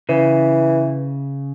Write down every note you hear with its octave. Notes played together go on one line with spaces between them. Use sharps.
C#3 E3